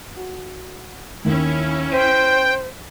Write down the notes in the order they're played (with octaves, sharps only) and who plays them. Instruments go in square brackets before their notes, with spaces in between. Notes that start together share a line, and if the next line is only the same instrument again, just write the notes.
[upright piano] F#4
[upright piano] D#2 D#3 [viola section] C#4 E4
[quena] C5 [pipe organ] G5 [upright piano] B6 D#7